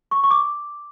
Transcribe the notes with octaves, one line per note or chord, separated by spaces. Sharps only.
C#6
C#6
D6